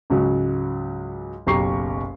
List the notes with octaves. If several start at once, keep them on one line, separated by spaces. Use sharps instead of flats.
C#2 G#2 C#3 F#3
F#1 B1 G4 A#5 C#6 C7